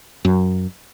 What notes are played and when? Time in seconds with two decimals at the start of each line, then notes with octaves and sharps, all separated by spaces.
0.25 F#2